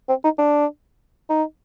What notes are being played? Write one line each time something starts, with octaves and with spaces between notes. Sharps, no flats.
C4
D#4
D4
D#4